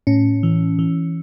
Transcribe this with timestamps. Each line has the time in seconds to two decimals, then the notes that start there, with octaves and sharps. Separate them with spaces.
0.07 A2 C#4
0.43 E3
0.79 E3